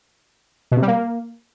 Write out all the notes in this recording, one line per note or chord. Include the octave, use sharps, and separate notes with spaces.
B2
C3
G3
A#3